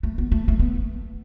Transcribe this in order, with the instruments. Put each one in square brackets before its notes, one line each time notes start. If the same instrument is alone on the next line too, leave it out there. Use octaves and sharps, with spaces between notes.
[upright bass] A3
B3
A3
A3
B3